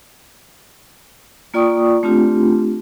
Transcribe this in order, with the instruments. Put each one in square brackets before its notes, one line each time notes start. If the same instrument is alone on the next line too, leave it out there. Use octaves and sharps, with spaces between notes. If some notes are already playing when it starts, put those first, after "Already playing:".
[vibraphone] A#3 F4 D5 G5 C#6 D#6
A3 C4 D4 F4 G4